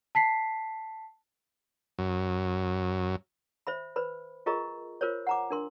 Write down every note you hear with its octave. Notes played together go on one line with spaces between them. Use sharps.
A5 B6 C7
F#2
C5 E5 B5
B4 C5 B5
F4 G#4 A#4 D#5 A#5 C#6
F4 A#4 C5 C#5
F#5 A#5 D6
D4 A#4 C6